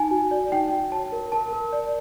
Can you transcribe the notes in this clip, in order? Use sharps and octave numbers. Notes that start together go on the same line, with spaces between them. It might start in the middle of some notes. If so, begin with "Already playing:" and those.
Already playing: D#4 G#5
F#4
D5
D#4 G5
F#4
C#5 A5
A#4
A#4 A5
A#4
D5